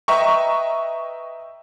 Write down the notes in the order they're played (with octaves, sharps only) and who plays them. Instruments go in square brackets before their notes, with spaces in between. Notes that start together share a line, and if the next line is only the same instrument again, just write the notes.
[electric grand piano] B4 D#5 E5 G5 A#5 C#6